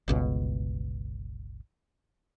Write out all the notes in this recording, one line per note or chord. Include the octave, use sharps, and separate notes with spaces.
G1 C#2 B2